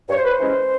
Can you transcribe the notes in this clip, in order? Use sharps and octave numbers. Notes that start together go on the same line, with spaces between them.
G2 C#5
C5
B4
C5
E3 G#3 C#4 E4